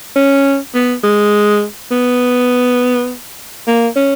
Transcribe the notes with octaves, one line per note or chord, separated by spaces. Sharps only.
C#4
B3
G#3
B3
A#3
C#4